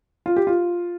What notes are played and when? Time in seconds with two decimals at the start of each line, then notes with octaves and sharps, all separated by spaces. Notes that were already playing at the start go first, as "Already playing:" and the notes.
0.26 F4
0.37 G4
0.47 F4